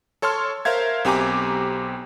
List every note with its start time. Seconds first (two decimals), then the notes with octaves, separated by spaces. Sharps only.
0.22 A4 C#5 A5 C6 F6
0.65 A#4 C5 E5 F5 G#6
1.05 B1 C4 G4 G#5 A#5 D6